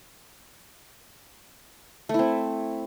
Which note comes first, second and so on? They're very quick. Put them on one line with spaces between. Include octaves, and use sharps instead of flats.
A3 E4 C4